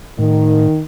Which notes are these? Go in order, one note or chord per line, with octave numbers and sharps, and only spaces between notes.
A2 D#3